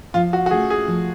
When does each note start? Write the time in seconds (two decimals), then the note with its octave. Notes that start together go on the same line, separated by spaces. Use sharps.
0.14 F3 F4
0.33 F#4
0.46 F#4
0.51 A3 C#4 G#4
0.70 G#4
0.88 F3